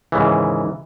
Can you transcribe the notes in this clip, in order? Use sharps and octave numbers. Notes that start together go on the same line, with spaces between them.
D#2 G#2 C#3 E3